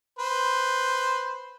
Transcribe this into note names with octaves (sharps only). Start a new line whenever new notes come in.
B4 C5